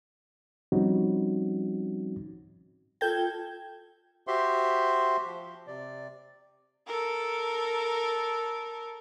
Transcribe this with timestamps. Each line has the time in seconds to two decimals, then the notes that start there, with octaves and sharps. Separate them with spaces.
0.72 F3 G3 C4 C#4 D#4 F#4
3.01 F4 A4 G5 G6 G#6
4.27 F#4 G4 C5 E5 C6
5.25 F3
5.67 C3 D5
6.87 A4 A#4